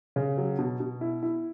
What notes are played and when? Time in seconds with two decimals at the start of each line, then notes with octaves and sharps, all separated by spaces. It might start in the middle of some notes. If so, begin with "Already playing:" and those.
0.16 C#3
0.38 F#3
0.59 B2
0.80 B2
1.01 E4
1.23 E4